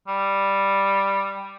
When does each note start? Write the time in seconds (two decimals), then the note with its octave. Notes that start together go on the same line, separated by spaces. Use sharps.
0.08 G3